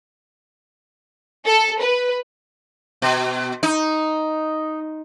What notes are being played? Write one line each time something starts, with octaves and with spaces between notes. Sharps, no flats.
A4
B4
B2
D#4